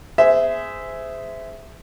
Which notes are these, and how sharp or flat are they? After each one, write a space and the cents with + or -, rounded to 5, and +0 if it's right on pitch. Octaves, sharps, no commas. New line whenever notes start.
G#4 +0 C5 -25 E5 +0